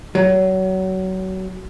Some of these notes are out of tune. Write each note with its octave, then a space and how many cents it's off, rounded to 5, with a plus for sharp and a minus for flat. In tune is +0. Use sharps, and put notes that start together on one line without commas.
F#3 +25